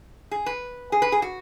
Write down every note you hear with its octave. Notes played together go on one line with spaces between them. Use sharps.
G#4
B4
G#4
B4
G#4
F#4